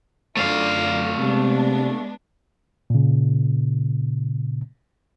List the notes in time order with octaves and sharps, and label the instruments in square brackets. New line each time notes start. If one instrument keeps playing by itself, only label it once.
[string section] F#2 D3 F4 [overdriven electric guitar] A3 F5
[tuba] C3 [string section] G#3 B3 D4
[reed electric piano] A#2 C#3